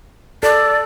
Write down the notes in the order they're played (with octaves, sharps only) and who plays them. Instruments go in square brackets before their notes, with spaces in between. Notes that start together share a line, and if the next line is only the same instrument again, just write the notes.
[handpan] A4 [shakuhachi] D5